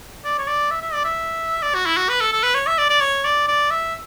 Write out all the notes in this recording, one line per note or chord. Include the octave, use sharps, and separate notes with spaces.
D5
C#5
D5
E5
E5
D5
E5
D5
F#4
E4
F#4
B4
A4
A4
B4
C#5
E5
D5
D5
C#5
D5
D5
E5